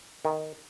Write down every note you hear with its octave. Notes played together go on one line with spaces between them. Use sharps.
D#3